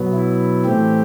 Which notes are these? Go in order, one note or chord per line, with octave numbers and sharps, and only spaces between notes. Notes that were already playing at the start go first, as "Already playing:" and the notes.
Already playing: B2 F#3 B3
E4
A2 E3 A3 C4 G4